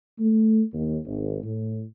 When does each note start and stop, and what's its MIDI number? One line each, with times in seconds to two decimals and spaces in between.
0.19 0.62 57
0.73 0.97 39
1.06 1.42 32
1.43 1.81 45